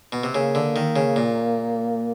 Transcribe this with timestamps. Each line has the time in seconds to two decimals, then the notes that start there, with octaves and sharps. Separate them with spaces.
0.12 B2
0.24 C3
0.35 C#3 A#3
0.55 D3
0.76 D#3
0.96 C#3
1.16 A#2